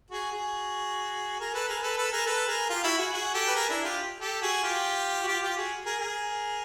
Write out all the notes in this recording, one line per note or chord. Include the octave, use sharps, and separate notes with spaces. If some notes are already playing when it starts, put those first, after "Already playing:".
F#4 G#4
F#4 G#4
G#4 A#4
A4 B4
G#4 A#4
A4 B4
A4 B4
G#4 A#4
A4 B4
G#4 A#4
F4 G4
E4 F#4
F#4 G#4
F#4 G#4
G4 A4
B4
G#4 A#4
D4 E4
F4 G4
G4 A4
F#4 G#4
F4 G4
F#4
F4 G4
F4 G4
F#4 G#4
G#4 A#4
G#4 A#4